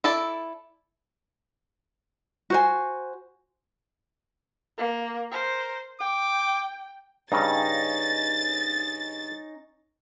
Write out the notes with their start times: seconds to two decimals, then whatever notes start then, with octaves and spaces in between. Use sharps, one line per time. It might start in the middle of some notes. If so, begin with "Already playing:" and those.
0.04 E4 A4 D5
2.50 F#4 C5 G#5
4.78 A#3
5.32 A#4 C5
6.00 G5 D6
7.32 G2 C#3 C#4 D#4 A#5 A6